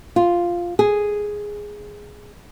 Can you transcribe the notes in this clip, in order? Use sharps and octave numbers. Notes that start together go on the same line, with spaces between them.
F4
G#4